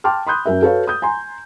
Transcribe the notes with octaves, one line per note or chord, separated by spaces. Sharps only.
G5 A5 C6 D6 F6
B5 C6 D#6 F#6 G6
F#2 A#4 E5
F#4 A4 B4 C#5 F5
D#6 G6
G#5 A#5 C6